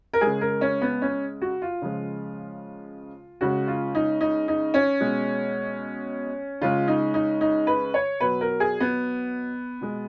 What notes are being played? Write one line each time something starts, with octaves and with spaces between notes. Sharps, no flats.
A#4
G#3 G#4
C#3
A#4
C#4
B3
C#4
F#4
F4
C#3 F3 G#3
C#3 G#3 F#4
F4
D#4
D#4
D#4
C#4
B2 G#3
C#3 G#3 F4
D#4
D#4
D#4
B4
C#5
B2 F#3 B4
A#4
G#4
B3
B2 G#3